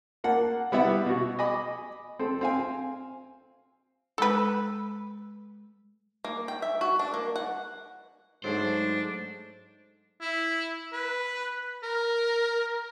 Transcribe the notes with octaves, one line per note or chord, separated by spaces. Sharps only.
A#3 F#5 A5
G3 B3 E4 E5 F#5
B2 F#4
D#5 G#5 B5 D6
C4 A4
C4 F5 G#5
G#3 A4 B4 B5 E6
A#3
G5
E5
F#4
D4
A#3
F#5
G#2 F#3 A3 D4 G#4 C5
E4
B4
A#4